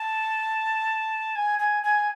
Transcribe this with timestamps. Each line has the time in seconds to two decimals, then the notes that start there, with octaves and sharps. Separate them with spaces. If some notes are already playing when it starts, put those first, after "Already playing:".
Already playing: A5
1.36 G#5
1.59 G#5
1.83 G#5